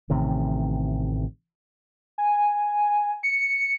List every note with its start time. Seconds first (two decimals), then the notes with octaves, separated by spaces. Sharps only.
0.10 A1 A2 C3 D#3
2.18 G#5
3.23 C#7